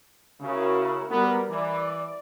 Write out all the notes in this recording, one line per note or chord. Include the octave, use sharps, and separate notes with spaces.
C#3 E4 F#4 A#4
G3 B3 A#4
E3 D5